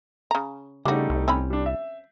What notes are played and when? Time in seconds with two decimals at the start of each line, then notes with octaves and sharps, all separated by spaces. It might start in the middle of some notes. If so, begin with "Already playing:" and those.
0.31 C#3 A#5
0.85 C#3 G3 A3 D4 D#4 F#4
1.10 C2
1.28 C4 C#4 B5
1.50 G3 D4
1.66 E5